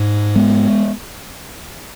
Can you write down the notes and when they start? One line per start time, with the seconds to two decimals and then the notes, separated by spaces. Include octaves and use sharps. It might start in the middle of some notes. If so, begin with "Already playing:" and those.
Already playing: G#2
0.35 G#3 B3